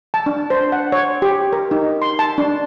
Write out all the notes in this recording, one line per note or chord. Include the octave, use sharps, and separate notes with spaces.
A5
D4
C5
F#5
C#5
G4
A#4
D#4
C6
A5
D4